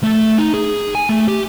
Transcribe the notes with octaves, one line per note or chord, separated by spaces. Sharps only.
A3
D#4
G#4
G#5
A3
G4